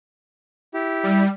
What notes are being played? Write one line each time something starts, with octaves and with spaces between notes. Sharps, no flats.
E4 G4
G3